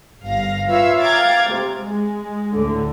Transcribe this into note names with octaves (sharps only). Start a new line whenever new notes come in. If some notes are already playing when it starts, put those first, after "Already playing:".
G1 F5 A#6
F4 B4 C#5 E5 F5 E6
F5 G5 A#5 D6 G#6 A6
C3
G#3
D2 A2 D3